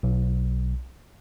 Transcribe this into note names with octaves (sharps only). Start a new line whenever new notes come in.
B1